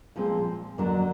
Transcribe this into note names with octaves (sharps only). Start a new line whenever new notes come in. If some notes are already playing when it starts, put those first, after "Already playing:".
A#2 F3 G#3 C4
F2 D3 F#3 A#3 D4